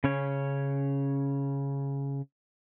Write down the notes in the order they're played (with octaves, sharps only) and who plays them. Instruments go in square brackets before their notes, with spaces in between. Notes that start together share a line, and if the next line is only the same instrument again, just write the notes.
[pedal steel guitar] C#3 C#4 C#5